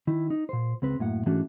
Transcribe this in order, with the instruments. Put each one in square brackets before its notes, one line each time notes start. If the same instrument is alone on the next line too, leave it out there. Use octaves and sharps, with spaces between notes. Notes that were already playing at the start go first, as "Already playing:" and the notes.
[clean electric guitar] D#3 E4
D#4
A#2 C5
C#2 C4 B4
F#2 A2 A#3 F#5
G#2 E3 A3 C#4 D4 F#4